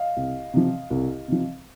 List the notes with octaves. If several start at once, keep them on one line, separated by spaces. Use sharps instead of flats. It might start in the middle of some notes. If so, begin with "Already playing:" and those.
Already playing: D#5 F5
C2
C3 F3
C2
C3 F3